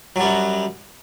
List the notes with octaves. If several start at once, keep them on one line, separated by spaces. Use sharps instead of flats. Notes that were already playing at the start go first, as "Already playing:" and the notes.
F#2 F#3 G3